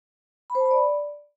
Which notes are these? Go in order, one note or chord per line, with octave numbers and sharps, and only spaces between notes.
B5
C5
A5
B5
D5